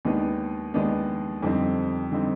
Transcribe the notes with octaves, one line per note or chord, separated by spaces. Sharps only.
D#2 D#3 G#3 B3 D4
D#2 D#3 G#3 B3 D4
F2 D3 G3 C4 D#4
D3 G3 C4 D#4